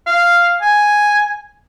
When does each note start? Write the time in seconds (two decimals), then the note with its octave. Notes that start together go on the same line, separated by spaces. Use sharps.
0.07 F5
0.62 G#5